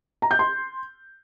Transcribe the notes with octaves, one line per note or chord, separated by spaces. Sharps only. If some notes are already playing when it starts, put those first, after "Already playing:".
A#5
G6
C6